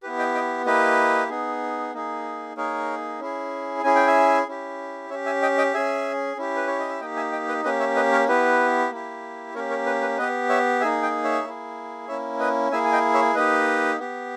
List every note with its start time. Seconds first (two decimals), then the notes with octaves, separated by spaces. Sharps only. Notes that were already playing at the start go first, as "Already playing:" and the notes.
0.03 B3 E4 G4 B4
0.19 D#5 G5
0.35 D#5 G5
0.66 A#3 E4 G4 B4 D#5
1.29 B3 D#4 G#4
1.94 A#3 D#4 G#4
2.56 A#3 D#4 G#4 A#4 C#5
3.20 C#4 E4 G#4
3.83 C#4 E4 G#4 G#5
3.95 G5
4.07 E5 G#5
4.48 C#4 E4 G4
5.10 C#4 C#5 E5
5.14 G4
5.26 E5 G#5
5.42 D#5 G5
5.58 D#5 G5
5.74 C#4 G#4 E5 G#5
6.37 C#4 E4 G4
6.56 B4
6.67 C#5
6.79 D#5
6.89 E5
7.00 A#3 D#4 G4 D#5 G5
7.16 E5 G#5
7.32 D#5 G5
7.48 B4 D#5
7.64 A#3 C#4 G4 B4 D#5
7.80 C#5 E5
7.96 B4 D#5
8.12 A#4 C#5
8.28 B3 E4 G4 B4
8.91 A#3 E4 G4
9.54 A#3 C#4 G4 A#4 C#5
9.70 A#4 C#5
9.86 B4
10.02 B4
10.18 B3 G4 B4 D#5
10.49 C#5 E5
10.81 A#3 D#4 G#4 E5 G#5
11.02 D#5 G5
11.24 C#5 E5
11.45 A#3 E4 G#4
12.08 A#3 C#4 E4 C#5 E5
12.39 B4 D#5
12.72 A#3 E4 G#4 E5 G#5
12.85 G#5
12.92 D#5 G5
13.14 C#5 E5
13.35 A#3 D#4 G4 B4 D#5
13.99 B3 G4